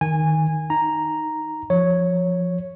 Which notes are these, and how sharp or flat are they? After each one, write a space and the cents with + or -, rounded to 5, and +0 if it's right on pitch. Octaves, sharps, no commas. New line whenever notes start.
D#3 +0 G#5 -20
D#4 +0 A#5 +0
F3 +0 C#5 +0